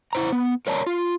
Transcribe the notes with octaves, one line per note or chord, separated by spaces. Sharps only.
E4 C5 A#5
B3
A#4 C#5 D5 A5 A#5
F4